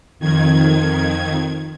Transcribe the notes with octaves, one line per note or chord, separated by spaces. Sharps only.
F2 D#3 G#6